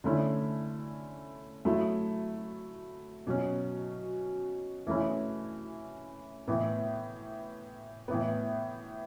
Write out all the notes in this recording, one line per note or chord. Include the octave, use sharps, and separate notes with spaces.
D3 A3 C#4 E4
F#3 A3 E4
B2 F#3 C#4
E3 A3 C#4 E4
A2 E3 B3
A2 E3 B3